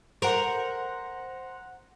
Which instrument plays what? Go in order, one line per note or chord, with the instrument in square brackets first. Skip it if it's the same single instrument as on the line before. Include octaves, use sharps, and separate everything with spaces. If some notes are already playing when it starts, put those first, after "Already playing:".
[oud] A#4 [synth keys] C5 F#5 A#5